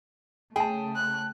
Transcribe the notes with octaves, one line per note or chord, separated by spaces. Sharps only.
C#3 A3 G#4 G5 A5
F#6